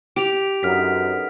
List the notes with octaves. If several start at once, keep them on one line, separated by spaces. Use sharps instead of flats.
G4 D7 F7
F#2 D3 B3 D#4 F6 B6